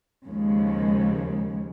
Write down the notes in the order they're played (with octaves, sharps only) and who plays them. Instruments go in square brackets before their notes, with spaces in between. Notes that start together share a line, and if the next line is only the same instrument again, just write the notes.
[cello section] D#2 C#3 F3 G#3